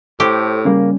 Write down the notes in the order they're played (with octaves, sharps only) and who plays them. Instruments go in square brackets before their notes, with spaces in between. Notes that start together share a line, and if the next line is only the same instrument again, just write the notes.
[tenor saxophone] A2 [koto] G4 [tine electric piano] A4 C5
[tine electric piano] C#3 A#3 [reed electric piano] G3 C#4